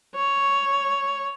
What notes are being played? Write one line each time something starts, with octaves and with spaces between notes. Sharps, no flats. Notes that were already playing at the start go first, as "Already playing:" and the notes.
C#5